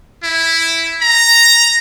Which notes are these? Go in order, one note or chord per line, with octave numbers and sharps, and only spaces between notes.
E4
A#5